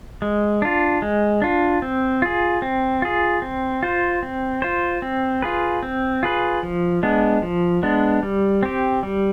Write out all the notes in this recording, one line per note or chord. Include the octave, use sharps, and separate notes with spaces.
G#3
D4 F4
G#3
D4 F4
C4
F4 G#4
C4
F4 G#4
C4
F4 C5
C4
F4 C5
C4
F4 G#4 B4
C4
F4 G#4 B4
F3
G#3 B3 D4
F3
G#3 B3 D4
G3
C4 G4
G3